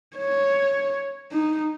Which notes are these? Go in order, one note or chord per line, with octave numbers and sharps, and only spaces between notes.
C#5
D#4